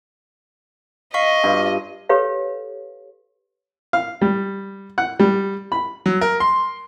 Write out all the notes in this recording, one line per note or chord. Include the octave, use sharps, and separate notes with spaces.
D#5 F5 C#6 B6
G2 F4
G4 A4 B4 C#5 F5
F5
G3
F#5
G3
B5
F#3
A#4
C6